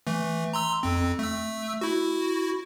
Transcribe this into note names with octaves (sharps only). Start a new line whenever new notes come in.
E3 A3
A#5 C6 E6
F2 C4
A3 E6
E4 F#4